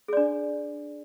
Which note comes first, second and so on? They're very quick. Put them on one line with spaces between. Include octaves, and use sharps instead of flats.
G#4 D5 D4